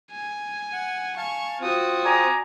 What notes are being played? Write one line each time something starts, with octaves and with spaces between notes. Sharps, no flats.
G#5
F#5
F5 G#5 A5 C#6
C4 F4 F#4 D#6
D5 G#5 A#5